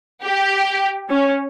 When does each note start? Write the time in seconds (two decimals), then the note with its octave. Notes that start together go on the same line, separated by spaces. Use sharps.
0.23 G4
1.10 C#4